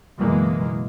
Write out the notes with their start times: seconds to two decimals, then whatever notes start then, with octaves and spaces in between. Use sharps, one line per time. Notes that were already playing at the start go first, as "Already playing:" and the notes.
0.20 F#1 B2 E3 G#3 A#3